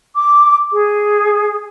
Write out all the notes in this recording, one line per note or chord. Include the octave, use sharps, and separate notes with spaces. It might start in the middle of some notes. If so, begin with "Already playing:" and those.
D6
G#4